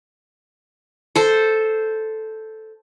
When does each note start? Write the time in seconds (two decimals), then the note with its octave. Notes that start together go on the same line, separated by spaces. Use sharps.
1.16 A4 C5